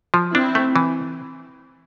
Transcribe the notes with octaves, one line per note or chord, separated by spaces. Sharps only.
F3
C4 D4 E4
A3
E3